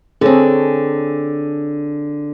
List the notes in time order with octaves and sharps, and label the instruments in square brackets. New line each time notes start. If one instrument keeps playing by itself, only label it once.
[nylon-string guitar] D3 C4 [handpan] G#4 A4 C#5